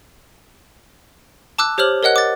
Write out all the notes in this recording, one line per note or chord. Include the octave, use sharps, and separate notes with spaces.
A5 D6 E6 F#6
G4 C5 C#5 F6 F#7
A#4 C#5 D#5 F#5 F#6
D6 A6